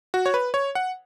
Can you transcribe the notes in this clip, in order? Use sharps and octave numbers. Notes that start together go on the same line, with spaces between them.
F#4
C#5
B4
C#5
F#5